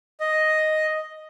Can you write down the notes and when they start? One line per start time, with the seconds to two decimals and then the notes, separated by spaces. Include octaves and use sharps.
0.20 D#5